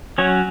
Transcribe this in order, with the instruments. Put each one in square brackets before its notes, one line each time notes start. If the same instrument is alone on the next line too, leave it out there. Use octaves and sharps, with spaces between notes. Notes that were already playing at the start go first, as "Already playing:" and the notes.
[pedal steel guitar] F#3 C#4 C#5